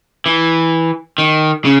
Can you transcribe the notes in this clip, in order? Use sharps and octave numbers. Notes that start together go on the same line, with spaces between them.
E3
D#3
C#3